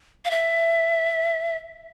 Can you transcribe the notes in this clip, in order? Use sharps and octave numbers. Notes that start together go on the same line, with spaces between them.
F5
E5